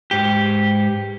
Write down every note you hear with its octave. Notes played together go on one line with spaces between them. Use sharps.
G#2 G4